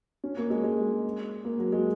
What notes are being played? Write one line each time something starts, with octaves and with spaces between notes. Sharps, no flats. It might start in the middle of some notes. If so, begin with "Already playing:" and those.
C#4
A#3
G#3
G#3
A#3
F#3
G#3